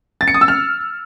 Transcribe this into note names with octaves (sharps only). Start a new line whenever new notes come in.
A6
C#7
D#6
E6
F6